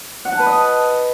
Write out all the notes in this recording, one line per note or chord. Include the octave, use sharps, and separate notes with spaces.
F#5
A5
B4
D#5
A5